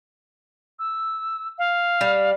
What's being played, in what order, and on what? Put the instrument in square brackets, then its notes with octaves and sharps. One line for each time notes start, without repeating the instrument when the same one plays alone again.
[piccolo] E6
F5
[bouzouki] G3